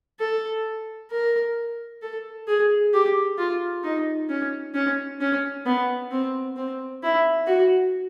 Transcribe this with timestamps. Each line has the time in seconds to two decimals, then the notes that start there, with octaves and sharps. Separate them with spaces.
0.20 A4
1.11 A#4
2.02 A4
2.47 G#4
2.93 G4
3.38 F4
3.84 D#4
4.29 C#4
4.74 C#4
5.20 C#4
5.66 B3
6.11 C4
6.56 C4
7.03 E4
7.47 F#4